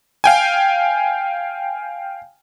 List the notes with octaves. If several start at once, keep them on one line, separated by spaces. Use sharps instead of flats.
F5 G5 G#5